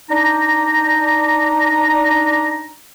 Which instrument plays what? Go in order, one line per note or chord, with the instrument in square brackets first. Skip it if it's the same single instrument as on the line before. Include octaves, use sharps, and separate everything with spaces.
[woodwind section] D4 D#4 A#5